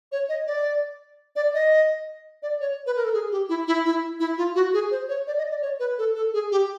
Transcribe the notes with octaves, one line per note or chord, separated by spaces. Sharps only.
C#5
D#5
D5
D5
D#5
D5
C#5
B4
A#4
A4
G#4
G4
E4
E4
E4
E4
F4
F#4
G#4
C5
C#5
D5
D#5
D5
C#5
B4
A4
A4
G#4
G4